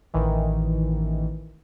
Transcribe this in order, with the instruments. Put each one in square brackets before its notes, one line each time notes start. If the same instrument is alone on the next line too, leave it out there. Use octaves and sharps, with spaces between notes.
[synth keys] A1 D#3 E3